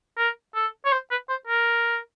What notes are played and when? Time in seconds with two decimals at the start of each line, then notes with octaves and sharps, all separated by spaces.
0.18 A#4
0.55 A4
0.85 C#5
0.92 C5
1.11 B4
1.30 C5
1.48 A#4